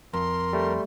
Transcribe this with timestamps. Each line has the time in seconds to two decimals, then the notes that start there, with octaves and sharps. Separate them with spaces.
0.13 F2 A#4 C6
0.53 G3 A3